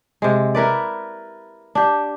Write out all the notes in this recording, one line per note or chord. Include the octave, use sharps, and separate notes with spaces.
C3 G#3
E4 A#4 B4 D5
D4 G4